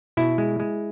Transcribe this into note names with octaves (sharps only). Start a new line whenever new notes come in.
B2 E4
G#3
G#3